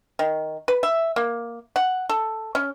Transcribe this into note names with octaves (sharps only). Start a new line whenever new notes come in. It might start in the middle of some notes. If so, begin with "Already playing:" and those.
D#3
B4
E5
A#3
F#5
A4
C#4